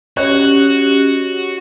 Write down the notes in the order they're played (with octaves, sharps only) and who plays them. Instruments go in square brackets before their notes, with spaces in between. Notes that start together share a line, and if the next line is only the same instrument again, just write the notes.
[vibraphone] C#4 G4 [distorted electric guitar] F#4 [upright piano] C#5 D#5 F#6